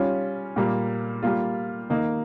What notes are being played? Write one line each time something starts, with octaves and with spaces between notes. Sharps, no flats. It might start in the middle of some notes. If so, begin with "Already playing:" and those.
Already playing: G3 C#4 F4
A#2 G3 A#3
G3 A#3 F4
D#3 A#3 D#4